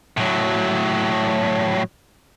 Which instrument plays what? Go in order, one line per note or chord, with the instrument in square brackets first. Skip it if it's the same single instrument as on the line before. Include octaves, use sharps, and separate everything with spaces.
[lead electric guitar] A2 F#3